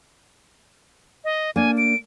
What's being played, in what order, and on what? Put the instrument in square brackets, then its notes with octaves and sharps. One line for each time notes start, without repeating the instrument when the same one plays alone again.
[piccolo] D#5
[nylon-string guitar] A#3 D4 [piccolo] G#5
[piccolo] D7